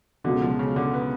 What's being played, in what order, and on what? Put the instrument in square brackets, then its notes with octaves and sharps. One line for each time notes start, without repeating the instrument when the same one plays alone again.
[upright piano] C#2 B2 F#3 [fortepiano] D3
[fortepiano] F3
C#3
D3
B3